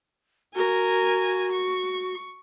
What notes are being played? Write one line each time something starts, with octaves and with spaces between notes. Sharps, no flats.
F#4 A#4 G#5
C#6